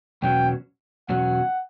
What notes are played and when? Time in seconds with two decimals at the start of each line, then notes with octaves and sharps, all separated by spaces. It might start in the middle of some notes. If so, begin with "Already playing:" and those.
0.23 E2 B2 F#3 C#4 F#4 G5
1.09 E2 B2 F#3 C#4 F#4 F#5